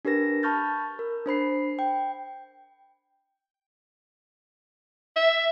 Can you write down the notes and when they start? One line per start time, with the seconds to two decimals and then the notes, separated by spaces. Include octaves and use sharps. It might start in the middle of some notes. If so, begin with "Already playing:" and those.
0.05 D4 G4 A#4 B4 A#6
0.43 A5 B5 C#6 F6 G6 A6
0.99 A#4
1.26 D4 C5 B5 C7
1.79 G5
5.16 E5